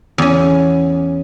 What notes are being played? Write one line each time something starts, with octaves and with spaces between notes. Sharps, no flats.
E2 C#4